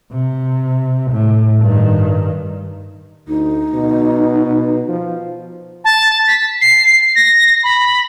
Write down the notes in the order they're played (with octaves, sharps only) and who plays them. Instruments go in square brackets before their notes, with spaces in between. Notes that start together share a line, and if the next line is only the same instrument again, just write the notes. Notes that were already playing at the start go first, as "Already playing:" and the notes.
[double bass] C3
A2
G2 D#3
[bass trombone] D2 [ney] D#4
[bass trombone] B2
B2
F3
[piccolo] A5
B6
C7
A#6
B5